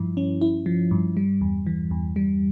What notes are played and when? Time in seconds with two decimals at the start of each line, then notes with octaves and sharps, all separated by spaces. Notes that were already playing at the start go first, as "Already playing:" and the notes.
Already playing: G2 F3 E4
0.17 C#4
0.41 E4
0.66 F3
0.91 G2
1.17 G3
1.41 E2
1.67 E3
1.91 E2
2.16 G3